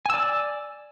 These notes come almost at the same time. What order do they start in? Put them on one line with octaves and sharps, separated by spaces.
G#5 E6 D5